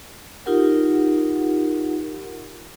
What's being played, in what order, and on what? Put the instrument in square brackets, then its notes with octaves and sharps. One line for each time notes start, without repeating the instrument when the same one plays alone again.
[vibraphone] D#4 F4 G4 A#4 F#5